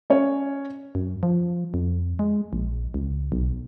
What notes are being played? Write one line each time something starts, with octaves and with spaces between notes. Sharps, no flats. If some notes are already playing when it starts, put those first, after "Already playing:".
C#4 C#5
F#2
F3
F2
G#3
A#1
C#2
B1